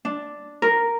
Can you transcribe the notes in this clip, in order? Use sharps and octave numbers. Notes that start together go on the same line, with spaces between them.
D4
A#4